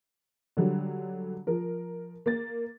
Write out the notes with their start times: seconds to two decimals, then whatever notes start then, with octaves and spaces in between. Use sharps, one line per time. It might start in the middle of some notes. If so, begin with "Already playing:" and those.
0.57 D3 F#3 G3
1.47 F3 A#4
2.26 A#3 A6